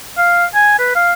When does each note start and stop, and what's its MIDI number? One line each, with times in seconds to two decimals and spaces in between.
0.18 0.45 77
0.54 0.75 80
0.79 0.92 71
0.96 1.13 77